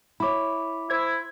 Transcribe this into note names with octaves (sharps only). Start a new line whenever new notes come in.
E4 C#5 B5 D6
E4 C5 G#6